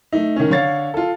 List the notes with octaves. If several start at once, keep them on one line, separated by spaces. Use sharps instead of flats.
A3 D#4
D#3 C#4
D3 C#5 F5 A6
F4 A4